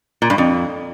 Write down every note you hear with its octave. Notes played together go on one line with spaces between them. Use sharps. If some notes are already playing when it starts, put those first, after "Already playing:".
A#2
G2
F2